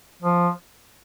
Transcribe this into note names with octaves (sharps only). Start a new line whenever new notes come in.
F3